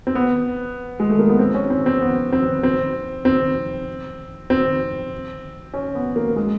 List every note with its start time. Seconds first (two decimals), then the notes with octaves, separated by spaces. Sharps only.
0.07 C4
0.15 B3
1.00 G#3
1.09 A3
1.19 A#3
1.29 B3
1.39 C4
1.54 C#4
1.70 C4
1.86 C4
2.01 B3
2.32 C4
2.63 C4
3.25 C4
4.50 C4
5.73 C#4
5.95 B3
6.16 A#3
6.36 G#3